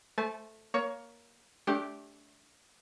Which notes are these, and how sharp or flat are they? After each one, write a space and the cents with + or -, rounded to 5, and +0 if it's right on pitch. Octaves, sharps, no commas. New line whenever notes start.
A3 +0 C5 +0 A5 -35
A#3 +10 C#5 +20
A3 -25 D4 -25 G4 +0